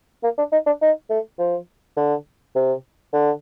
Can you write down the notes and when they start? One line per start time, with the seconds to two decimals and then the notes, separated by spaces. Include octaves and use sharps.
0.23 A#3
0.38 D4
0.52 D#4
0.66 D4
0.82 D#4
1.10 A3
1.38 F3
1.97 D3
2.56 C3
3.13 D3